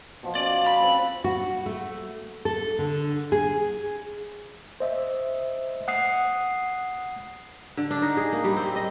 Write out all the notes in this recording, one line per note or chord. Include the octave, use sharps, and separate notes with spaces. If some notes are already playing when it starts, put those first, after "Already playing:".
B2 F3
C#4 D5
B5
C#3 C4 B4
F#4
A3
A4
D3
G#4
C5 D#5 E5
F#5 D#6 C7
D3
D4
D#4
G#4
A#3
G3
C4
D#5